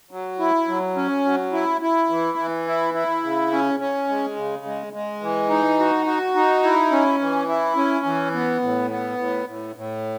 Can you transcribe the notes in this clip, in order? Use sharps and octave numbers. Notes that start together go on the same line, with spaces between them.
F#3
E4
F#3
C#4
F#3
E4
E4
E3
E3
E4
E4
C#3
C#4
C#4
G#3
C#3
G#3
G#3
E3
D#4
F#4
F#4
D#4
E4
C#4
E3
E4
C#4
E3
B3
A2
B3
A2
A2
A2